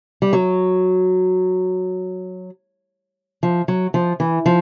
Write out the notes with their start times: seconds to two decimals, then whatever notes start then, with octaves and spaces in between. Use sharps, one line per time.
0.22 G3
0.33 F#3
3.43 F3
3.68 F#3
3.94 F3
4.20 E3
4.46 F3